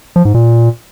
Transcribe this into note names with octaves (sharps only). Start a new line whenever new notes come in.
F3
G#2
A#2